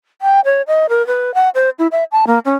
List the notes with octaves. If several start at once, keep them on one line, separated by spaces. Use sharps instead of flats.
G5
C#5
D#5
A#4
B4
F#5
C5
E4
E5
A5
A#3
C#4